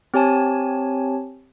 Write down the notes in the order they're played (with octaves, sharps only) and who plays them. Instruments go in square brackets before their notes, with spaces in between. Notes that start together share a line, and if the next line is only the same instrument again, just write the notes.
[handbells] C4 G4 C#5 G#5 A5